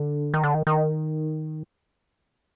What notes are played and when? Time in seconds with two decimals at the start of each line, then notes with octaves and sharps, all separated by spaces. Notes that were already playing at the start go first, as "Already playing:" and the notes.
Already playing: D3
0.34 D#3
0.44 D3
0.54 D#3
0.67 D#3